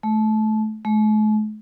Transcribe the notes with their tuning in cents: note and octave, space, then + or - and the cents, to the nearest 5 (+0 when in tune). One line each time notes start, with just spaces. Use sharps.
A3 -25
A3 -45